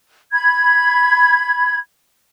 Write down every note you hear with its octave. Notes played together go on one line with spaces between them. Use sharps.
B5 G#6